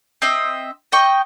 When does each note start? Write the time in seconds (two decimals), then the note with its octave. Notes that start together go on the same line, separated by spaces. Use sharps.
0.22 C4 D#5 E5
0.92 D#5 G5 C#6